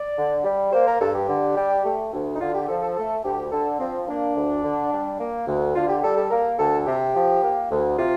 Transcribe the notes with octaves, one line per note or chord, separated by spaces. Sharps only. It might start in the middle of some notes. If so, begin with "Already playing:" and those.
Already playing: D5
D3
G3
A#3 C5
A#4
G2 A4
G4
D3
G3
A3
D2
D#4
D3 F4
G4
F3 A4
A4
A3 A4
D2 G4
D3 A4
F3 C4
A#3 D4
D2
D3
G3
A#3
D2
D3 F4
G4
G3 A4
A4
A#3 A#4
D2 A4
C3 G4
F3
A#3
D2
C3 F4